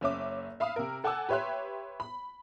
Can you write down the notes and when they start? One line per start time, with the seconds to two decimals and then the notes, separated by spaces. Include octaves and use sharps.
0.01 F#1 C#4 E5 D6
0.60 E5 F5 B5 D#6
0.76 C3 A#4
1.04 A4 F#5 G#5 A5 D6 E6
1.29 G4 B4 C#5 E5 C6 F#6
2.00 B5